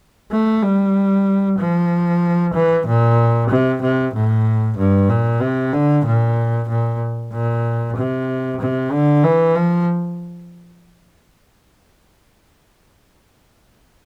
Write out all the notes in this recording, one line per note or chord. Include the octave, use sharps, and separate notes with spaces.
A3
G3
F3
E3
A#2
C3
C3
A2
G2
A#2
C3
D3
A#2
A#2
A#2
C3
C3
D3
E3
F3